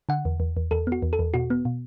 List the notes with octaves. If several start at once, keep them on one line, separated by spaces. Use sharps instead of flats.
D3 F#5
E2
E2
E2
E2 A4
B3
F#4
E2
A4
E2
B2 F#4
B3
B2